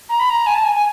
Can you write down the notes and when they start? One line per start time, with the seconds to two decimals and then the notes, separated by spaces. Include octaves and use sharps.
0.09 A#5
0.19 B5
0.30 A#5
0.46 G#5
0.54 A5
0.64 G#5
0.74 G#5